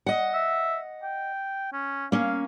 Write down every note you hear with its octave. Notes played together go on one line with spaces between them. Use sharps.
D#5 F#5
E5
G5
C#4
A#3 C#4 F5